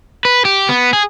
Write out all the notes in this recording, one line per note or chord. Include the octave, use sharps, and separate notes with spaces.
B4
G4
B3
G#4